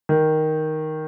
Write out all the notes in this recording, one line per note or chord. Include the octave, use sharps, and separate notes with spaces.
D#3